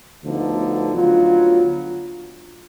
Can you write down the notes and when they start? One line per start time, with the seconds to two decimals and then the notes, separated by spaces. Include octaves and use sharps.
0.22 D2 D3 F3 B3 D#4
0.94 D2 D3 F#3 B3 F4